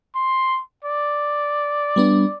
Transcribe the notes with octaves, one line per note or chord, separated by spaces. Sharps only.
C6
D5
G3 B3 D4